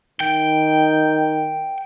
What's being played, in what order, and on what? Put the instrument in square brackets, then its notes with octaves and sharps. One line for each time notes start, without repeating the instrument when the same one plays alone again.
[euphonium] D#3 [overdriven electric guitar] G5